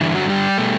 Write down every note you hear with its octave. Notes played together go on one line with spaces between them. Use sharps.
G2 D3 E3 E4
F#3 F#4
G3 G4
B2 A3